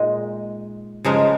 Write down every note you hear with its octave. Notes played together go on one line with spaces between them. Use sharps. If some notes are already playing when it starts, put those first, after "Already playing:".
Already playing: A#2 G#3 D#4
C#3 F3 G#3 D#4 A#4